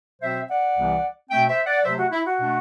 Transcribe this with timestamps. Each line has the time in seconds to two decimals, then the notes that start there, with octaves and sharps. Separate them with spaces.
0.22 B2 F#3 C4 C5 E5
0.49 D5 F#5
0.77 C2 C3 E3 G3 B3
1.30 B2 A3 C4 E5 G5
1.48 C5 E5
1.67 D5 F#5
1.84 C3 F#3 A3 C5 E5
1.98 F#4
2.12 E4
2.25 F#4
2.39 B2 A3 D4